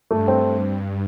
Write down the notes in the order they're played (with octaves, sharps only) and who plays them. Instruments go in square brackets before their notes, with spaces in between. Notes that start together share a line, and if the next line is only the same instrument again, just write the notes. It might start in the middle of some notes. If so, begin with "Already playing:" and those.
[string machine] G2 [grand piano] A3
[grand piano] C4